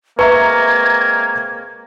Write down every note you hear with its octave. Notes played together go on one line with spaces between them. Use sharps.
G#3 A#3 C4 B4 E5 A#5 C#6 G#6